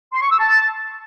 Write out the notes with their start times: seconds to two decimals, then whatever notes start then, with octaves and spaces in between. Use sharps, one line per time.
0.12 C6
0.21 C#6
0.31 E6
0.40 A5